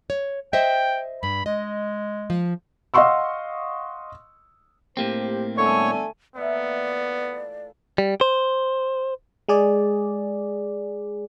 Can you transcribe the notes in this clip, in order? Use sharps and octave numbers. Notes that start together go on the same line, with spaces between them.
C#5
C5 D#5 E5 G5
G2 B5
G#3 D#5
F3
D#5 F5 F#5 C6 C#6 E6
A2 A#3 C4 G4 C5
D3 G3 A3 B3 C#5 G#5 C#6
A#2 E3 A3 B3 D5
G3
C5
G#3 G#4 D5